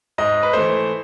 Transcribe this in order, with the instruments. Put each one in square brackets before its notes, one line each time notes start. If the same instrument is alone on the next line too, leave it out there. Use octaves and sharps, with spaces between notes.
[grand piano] G#2 D#5
B4
E3 A3 C5